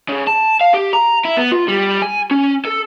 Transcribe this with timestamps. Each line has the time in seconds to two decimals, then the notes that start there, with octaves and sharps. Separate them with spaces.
0.09 C#3
0.27 A5
0.61 F5
0.74 G4
0.93 A#5
1.25 E4
1.37 B3
1.52 F4
1.68 G3
2.02 G#5
2.31 C#4
2.65 A4